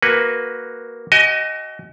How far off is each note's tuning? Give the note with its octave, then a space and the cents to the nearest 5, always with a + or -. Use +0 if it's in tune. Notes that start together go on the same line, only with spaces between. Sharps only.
A#3 +5 F#4 +0 B4 +0
F#4 +40 D#5 +5 G#5 +0